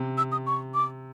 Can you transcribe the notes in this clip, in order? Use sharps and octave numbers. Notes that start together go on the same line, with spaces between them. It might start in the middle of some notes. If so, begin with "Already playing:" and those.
Already playing: C3
E6
D#6
C#6
D6